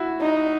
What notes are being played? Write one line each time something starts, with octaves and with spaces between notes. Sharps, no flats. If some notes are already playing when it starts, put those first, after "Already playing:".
Already playing: E4 F#4
D#4